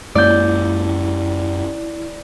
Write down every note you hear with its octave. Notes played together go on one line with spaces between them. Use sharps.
F#2 G#3 A#3 E4 D5 G6